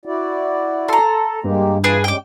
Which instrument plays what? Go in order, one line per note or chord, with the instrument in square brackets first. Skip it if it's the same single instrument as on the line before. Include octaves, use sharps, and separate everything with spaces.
[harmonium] E4 F#4 D5
[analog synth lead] A4 [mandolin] A#5 C6
[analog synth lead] G2 [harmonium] G#3 A#3 G4
[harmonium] E3 F4 [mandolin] D4 G#4 B4
[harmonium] G3 G#3 C#4 [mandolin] G5 D6